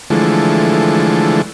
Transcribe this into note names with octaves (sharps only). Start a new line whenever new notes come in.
D3 E3 F3 G#3 A3